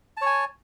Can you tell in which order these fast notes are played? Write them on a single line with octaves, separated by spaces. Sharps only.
A5 C#5 G#5